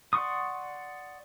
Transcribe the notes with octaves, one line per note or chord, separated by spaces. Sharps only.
D5 F#5 C6 C#6 D#6